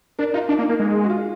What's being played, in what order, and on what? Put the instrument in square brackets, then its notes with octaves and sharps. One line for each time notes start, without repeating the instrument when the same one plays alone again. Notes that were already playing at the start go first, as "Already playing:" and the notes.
[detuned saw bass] D4 [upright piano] A#4
[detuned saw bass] D#4 [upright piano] F4
[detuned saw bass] D4 [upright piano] D#4
[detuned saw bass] A#3
A#3
G#3
[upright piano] F#4
F4